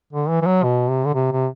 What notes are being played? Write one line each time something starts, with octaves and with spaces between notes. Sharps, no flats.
D3
E3
E3
F#3
B2
C3
D3
C3
C3